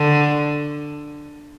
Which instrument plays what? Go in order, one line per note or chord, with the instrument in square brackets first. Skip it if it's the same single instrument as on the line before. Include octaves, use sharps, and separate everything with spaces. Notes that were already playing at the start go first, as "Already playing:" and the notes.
Already playing: [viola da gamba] D3